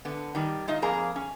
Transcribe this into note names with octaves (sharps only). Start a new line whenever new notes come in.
D3 B3
D#3 G3
G#3 D#4 F4 D#5
F2 A#3 G#4 A#5
C#4